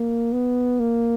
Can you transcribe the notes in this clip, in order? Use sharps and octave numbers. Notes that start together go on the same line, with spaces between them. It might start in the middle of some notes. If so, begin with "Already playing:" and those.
Already playing: A#3
B3
A#3